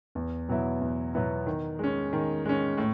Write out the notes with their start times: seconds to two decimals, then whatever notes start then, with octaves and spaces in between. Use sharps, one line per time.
0.15 E2
0.49 B2 F#3 B3 E4
0.81 E2
1.14 B2 F#3 B3 E4
1.47 D#3
1.79 G#3 C#4
2.13 D#3
2.45 G#3 C#4
2.77 A2